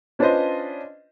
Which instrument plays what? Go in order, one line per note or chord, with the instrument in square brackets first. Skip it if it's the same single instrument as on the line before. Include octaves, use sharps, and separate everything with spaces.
[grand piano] C#4 D4 F4 B4 C5 D#5